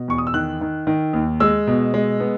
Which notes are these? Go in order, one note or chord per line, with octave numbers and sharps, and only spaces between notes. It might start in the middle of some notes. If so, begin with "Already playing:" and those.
Already playing: B2
E2 C#6
D#6
E6
D#3 F#6
D#3
D#3
D#2
G#3 E6
B2
G#3
B3